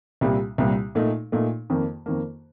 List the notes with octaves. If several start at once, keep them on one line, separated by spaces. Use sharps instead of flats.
C2 A#2 G3
C2 A#2 G3
A#2 A3 D#4
A#2 A3 D#4
F2 D#3 A#3
F2 D#3 A#3